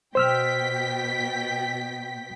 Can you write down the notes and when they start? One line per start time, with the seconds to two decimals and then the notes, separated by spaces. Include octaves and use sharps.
0.15 B2 C5 G5 E6 F6 B6